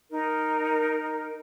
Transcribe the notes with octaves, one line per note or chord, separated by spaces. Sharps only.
D#4 A#4